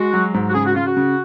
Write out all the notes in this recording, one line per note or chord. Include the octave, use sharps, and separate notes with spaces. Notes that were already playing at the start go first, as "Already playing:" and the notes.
Already playing: G#3 F#4
F#3
G#2
F#4
C#3 G#4
F#4
C#3 F4
F#4
C#3